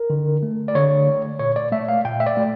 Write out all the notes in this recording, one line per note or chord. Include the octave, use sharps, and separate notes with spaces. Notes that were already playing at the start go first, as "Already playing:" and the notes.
Already playing: A#4
D3
A3
D5
D3 C#5
A3
A#2 C#5
D5
A3 E5
F5
A#2 G5
E5
D5
A3